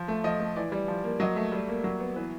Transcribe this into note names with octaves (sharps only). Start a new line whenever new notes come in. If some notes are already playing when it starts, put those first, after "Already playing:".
Already playing: F3
A3
F3 D#5
A3
E3 D5
G3
F3
A#3
F#3 D#5
A3 E5
G3
A#3
F#3
B3
E3 B4